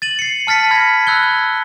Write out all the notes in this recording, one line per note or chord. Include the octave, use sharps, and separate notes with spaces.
A6 D#7 F#7
C7 C#7
A5 F6 A6 B6 C#7
B5 F6 G#6 A#6
B5 E6 F#6 G#6 G7